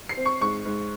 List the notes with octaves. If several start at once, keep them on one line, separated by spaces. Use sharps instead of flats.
C7
C4
C#6
G#2 C#6
G#2